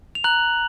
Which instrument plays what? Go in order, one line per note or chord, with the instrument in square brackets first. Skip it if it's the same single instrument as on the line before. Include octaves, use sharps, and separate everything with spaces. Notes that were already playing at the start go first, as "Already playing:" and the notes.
[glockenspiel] F7
A#5 F#6 F#7